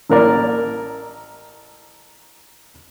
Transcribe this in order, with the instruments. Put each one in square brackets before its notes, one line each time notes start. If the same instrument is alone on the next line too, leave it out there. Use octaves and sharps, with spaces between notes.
[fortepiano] A1 A#3 A#4 D5